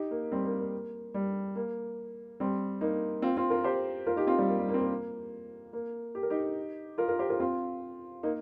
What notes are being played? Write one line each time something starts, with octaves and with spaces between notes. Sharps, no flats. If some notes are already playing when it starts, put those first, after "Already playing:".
Already playing: D#4 G4
A#3
G3 C4
A#3
A#3
G3
A#3
G3 C4
A#3 D#4
C4 F4
C4 F4
F4 A#4
G4 C5
F4 A#4
D#4 G4
C4 F4
G3 C4
A#3
G3
A#3
C4
A#3
A#3
G4
A#4
D#4 G4
F4 A#4
F4 A#4
G4 C5
F4 A#4
C4 F4
A#3 D#4